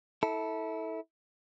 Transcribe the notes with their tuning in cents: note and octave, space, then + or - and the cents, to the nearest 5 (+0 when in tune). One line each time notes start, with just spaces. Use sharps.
E4 -25 A4 +0